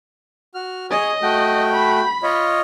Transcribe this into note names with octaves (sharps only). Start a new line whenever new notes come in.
F#4 F6
G#4 C#5 D#5 D#6
A3 F#4 G5
B5
F4 C#5 D#5